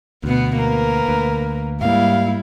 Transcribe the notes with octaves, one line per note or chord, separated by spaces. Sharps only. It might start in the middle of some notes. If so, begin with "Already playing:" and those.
D2 B2 B3
A#3 A#4 B4
D2
G#2 G3 A#3 E4 F5